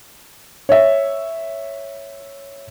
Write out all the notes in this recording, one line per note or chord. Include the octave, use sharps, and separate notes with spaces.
C#5 E5